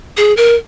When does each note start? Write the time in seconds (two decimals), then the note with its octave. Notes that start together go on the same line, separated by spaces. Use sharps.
0.17 G#4
0.37 A#4